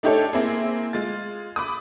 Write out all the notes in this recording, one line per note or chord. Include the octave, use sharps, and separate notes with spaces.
A3 D4 D#4 G4 A4 C#5
A#3 C4 E4 G#4
G#3 F4 A6
B5 D6 D#6